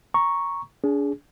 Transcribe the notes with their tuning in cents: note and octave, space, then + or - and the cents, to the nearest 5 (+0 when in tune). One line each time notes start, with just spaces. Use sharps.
A#5 +5 C#6 +0
D4 -40 G#4 +0